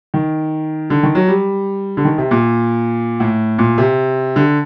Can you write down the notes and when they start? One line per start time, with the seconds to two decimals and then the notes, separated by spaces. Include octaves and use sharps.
0.14 D#3
0.90 D3
1.03 D#3
1.15 F#3
1.28 G3
1.97 D3
2.05 D#3
2.18 C3
2.31 A#2
3.20 A2
3.58 A#2
3.78 C3
4.36 D3